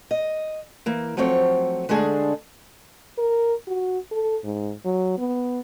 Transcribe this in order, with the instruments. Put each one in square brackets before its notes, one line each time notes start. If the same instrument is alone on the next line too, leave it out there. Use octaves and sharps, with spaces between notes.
[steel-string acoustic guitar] D#5
E3 A#3
F3 F#3 A3 C4 C#5
D3 G#3 A3 D4 G#4
[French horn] A#4
F#4
A4
G#2
F#3
B3